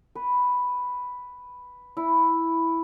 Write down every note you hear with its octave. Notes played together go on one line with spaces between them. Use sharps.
B4
E4